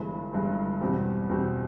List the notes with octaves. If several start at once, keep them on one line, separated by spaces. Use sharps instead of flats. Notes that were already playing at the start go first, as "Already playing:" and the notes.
Already playing: G1 G2 E3 G#3
G1 G2 E3 G#3
E2 B2 G3 C4
E2 B2 G3 C4